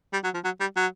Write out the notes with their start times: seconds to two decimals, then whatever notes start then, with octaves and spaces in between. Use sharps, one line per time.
0.13 G3
0.24 F#3
0.34 F3
0.44 F#3
0.60 G3
0.76 F#3